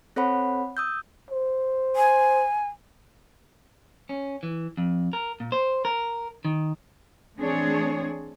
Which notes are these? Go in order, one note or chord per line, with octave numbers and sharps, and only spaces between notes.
C4 A4 C5 C#5 F#5 B5
D#6 E6 G6
C5
G#5
C#4
E3
F2
A#4
A#2
C5
A#4
D#3
E3 A3 C4 D4 G#4 C#5